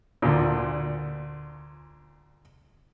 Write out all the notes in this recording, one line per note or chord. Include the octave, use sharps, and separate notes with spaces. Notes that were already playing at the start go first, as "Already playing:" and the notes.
D2 A#2